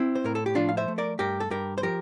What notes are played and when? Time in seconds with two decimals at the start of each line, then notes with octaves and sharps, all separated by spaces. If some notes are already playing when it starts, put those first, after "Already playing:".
Already playing: C4 E4
0.15 C5
0.24 A2 A#4
0.35 A4
0.46 G4
0.55 F3 D4 F4
0.69 F5
0.77 C5 E5
0.88 A3
0.98 A#4 D5
1.19 G2 G4 A#4
1.40 A4
1.50 G2 G4 A#4
1.78 C5
1.83 F3 G4 A#4